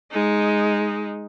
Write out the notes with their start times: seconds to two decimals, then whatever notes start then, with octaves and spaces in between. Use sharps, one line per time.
0.11 G#3 D#4